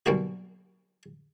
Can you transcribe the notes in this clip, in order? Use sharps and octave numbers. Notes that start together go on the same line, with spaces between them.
B1 G2 A#3 F#4